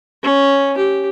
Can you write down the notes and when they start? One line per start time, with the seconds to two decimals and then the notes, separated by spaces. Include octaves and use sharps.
0.24 C#4
0.77 G4